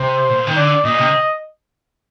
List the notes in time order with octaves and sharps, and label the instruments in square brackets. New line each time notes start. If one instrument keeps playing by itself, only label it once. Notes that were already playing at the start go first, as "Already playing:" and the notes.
Already playing: [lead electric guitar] C3 [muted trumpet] C5
[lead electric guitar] A#2
D#3
[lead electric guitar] D3 [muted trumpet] D5
[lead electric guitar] A#2 [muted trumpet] D#5
[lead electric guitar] C3